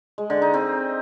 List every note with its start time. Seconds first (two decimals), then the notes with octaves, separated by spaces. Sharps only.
0.18 G#3
0.30 D3
0.42 D#4
0.54 C4